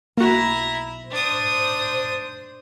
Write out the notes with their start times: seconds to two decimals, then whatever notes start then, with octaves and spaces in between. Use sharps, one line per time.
0.18 B1 A#3 E4 F#4 A#5
1.11 D4 C5 D#6